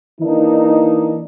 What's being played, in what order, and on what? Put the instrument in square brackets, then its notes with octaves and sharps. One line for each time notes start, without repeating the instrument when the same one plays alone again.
[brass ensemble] E3 A#3 D4 D#4